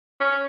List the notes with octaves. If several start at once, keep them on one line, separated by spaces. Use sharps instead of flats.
C#4